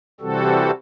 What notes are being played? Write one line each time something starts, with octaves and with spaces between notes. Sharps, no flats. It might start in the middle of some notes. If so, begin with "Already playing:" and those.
C3 E3 G3 C4 F#4 A4